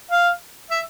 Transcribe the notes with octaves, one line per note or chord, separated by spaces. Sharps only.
F5
E5